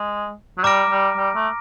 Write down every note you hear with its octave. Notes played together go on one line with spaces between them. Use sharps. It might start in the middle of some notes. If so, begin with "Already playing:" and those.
Already playing: G#3
F#3
G3 A#5 D6 F6 A#6 D7
G3
G3
A3